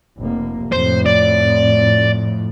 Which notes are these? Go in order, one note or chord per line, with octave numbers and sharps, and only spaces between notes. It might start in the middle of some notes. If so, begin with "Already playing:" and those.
F1 A#3
F2 A2 C5
D5